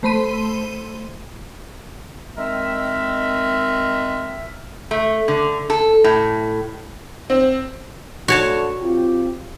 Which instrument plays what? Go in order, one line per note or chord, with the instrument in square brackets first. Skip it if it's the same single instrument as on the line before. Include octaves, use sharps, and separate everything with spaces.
[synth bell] A3 C5 B5 C6 D#7
[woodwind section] D#3 G#3 C4 A#4 E5
[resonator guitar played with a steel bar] A3
D3
A4
A2
[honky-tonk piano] C4
[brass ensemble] D2 D3 [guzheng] F#4 C#5 A5
[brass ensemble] C4 F4 G4